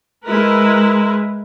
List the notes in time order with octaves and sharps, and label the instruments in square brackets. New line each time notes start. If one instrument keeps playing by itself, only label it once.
[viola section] G#3 E4 A#4 B4